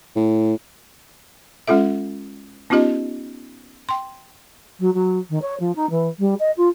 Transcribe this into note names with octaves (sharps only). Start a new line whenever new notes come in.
A2
G#3 C#4 F4 A4 E5
B3 C#4 D#4 F4 G4 D#5
G5 C6
F#3
F#3
D#3
C#5
F3
D#4
E3
G3
D#5
F4